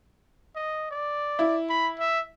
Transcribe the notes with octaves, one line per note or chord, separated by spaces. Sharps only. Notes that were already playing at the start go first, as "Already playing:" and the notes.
D#5
D5
E4
B5
E5